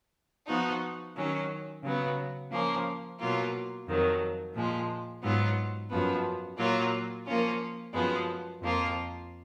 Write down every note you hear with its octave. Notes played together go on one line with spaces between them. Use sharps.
F3 B3 D#4 F#4
D#3 F#3 C#4
C#3 F#3 B3
F3 A#3 C#4
B2 F#3 A#3 F4
F2 D#3 F#3
A#2 F3 G#3
G#2 F#3 B3 F4
F#2 F3 B3
A#2 F#3 A#3 F4
F3 A#3 C#4 F4
F#2 F3 G#3 B3
F2 F3 A#3 F4